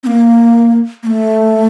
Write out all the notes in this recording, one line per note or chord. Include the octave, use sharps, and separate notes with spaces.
C4
A#3
A#3
A3